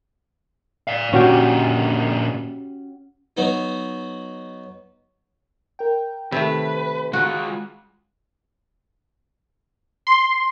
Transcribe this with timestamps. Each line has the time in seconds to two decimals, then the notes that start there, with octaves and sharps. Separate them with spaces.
0.87 D5 F5
1.13 A#2 D3 C#4 F#4 G4
3.37 F#3 B3 D#4
5.79 A#4 G5
6.32 C3 D#3 A3 B4 E5
7.13 G#3 F4 F#4
10.07 C6